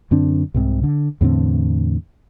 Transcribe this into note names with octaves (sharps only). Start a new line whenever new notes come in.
F#2 D3 C4 D4
C2 G#2 C3
D3
E2 A2 D3 C4